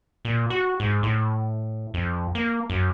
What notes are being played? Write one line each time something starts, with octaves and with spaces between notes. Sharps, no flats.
A#2
F#4
G#2
A2
F2
A#3
F#2